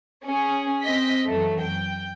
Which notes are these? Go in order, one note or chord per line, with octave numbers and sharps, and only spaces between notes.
C#4 G#4
C4 D#5 B6
F#2 E3 F#3 A3
G5